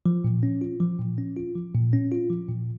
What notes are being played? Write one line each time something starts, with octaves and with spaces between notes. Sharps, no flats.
F3
A#2
C#4
F4
F3
A#2
C#4
F4
F3
A#2
C#4
F4
F3
A#2